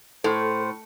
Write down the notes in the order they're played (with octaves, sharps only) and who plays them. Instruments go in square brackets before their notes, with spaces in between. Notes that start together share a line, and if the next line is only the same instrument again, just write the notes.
[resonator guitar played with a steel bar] A2 [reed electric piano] A4 [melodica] C5